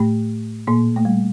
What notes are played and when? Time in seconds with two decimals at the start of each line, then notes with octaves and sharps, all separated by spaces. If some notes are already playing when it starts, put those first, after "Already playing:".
Already playing: A2 A3
0.67 A#2 A#3
0.96 A3
1.05 G3